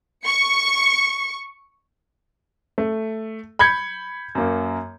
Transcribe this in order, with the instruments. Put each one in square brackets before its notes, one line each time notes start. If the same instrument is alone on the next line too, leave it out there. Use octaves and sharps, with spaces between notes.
[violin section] C#6 C#7
[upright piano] A3
B5 G6 G#6 C#7
F#2 A#3